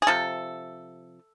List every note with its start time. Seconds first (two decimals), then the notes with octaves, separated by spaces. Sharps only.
0.02 G#4
0.07 C3 F3 A4